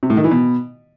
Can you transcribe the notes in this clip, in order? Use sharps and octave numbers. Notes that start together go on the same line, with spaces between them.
C3
A2
D#3
E3
B2